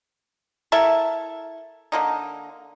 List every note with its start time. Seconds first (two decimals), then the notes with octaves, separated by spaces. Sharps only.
0.72 E4 A4 A#4 E5
1.92 D3 A#3 D#4